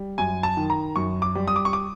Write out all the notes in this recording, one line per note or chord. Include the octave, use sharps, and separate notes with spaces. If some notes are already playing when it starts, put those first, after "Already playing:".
Already playing: G3
F#2 G#5
A5
D#3
A#5
F#2 C#6
D6
G3
D#6
D6
C#6
D6